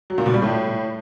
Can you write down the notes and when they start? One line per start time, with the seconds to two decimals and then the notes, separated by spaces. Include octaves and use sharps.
0.10 F#3
0.18 A#2
0.26 B2
0.34 G3
0.42 A2